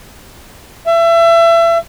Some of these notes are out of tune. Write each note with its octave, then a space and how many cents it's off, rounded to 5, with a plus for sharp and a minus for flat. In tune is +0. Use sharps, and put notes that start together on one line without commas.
E5 +30